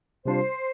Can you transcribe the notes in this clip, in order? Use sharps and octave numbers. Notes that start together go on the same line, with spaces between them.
C3 G3 D4 F4 C5